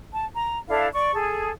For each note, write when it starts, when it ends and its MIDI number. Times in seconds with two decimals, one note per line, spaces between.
0.12 0.27 81
0.35 0.58 82
0.68 0.88 62
0.68 0.88 64
0.68 0.88 69
0.68 0.88 77
0.93 1.13 74
0.93 1.13 85
1.14 1.52 68
1.14 1.52 69